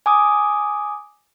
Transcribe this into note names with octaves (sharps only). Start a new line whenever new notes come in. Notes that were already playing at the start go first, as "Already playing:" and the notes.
G#5 D6 D#6